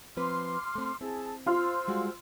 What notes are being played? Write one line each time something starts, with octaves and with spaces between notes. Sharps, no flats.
F3 C4 B4 C6 D6 F6
A3 C4
C4 E4 G#4 A5 E6
F4 C5 C6 E6 F6
G3 G#3 F#4